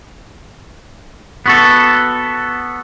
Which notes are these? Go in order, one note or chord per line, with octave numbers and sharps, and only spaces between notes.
B3 F#4 A4